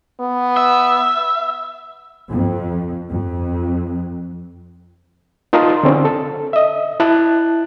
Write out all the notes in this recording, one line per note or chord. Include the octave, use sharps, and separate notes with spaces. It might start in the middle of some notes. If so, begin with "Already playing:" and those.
B3
E5
F2
F2
D#4 F4 A#4 D#5 A5 C6
D3 C4 C#4
A4
D#5 E5
E4 A5 F#6